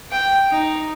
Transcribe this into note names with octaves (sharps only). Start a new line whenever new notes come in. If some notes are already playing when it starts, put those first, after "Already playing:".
G5
D#4